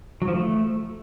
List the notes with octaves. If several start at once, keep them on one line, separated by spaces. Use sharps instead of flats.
F#3
F3
A3